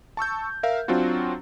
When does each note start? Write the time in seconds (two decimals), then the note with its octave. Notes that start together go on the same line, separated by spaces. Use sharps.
0.17 A5 C#6 E6 G6
0.63 A#4 E5 F5
0.88 F#3 C4 D4 F4 F#4